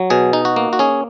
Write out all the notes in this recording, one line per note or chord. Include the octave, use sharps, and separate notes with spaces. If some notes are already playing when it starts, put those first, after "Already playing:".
Already playing: F#3
B2 G#4
D#4
F#4
A#3
F#4
C#4 G#4